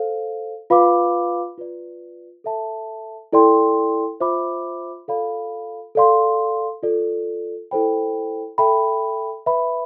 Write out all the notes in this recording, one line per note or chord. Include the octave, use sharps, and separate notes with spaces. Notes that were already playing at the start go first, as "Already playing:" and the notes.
Already playing: A4 C5 F5
F4 B4 F5 B5 D6
F4 B4 D5
A4 E5 A5
E4 A4 D5 G5 C6
F4 C5 E5 B5 D6
F4 A4 D5 F5 B5
A4 D5 F5 C6
F4 A4 D5
E4 A4 C5 G5 B5
A4 E5 G5 B5
B4 E5 B5